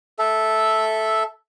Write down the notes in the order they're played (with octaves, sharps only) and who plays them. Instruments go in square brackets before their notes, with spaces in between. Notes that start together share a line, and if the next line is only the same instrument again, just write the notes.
[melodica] A4 E5